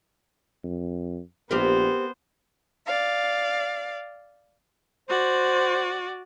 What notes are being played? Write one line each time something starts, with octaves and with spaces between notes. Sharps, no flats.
F2
A#1 B3 C4 G4 A#4 C5
D5 F5
F#4 C5 D5